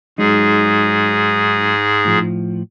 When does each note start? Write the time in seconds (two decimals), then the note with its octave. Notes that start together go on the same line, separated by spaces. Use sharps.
0.18 G#2 F#3 G#3 D#4 G#4
2.05 A2 F3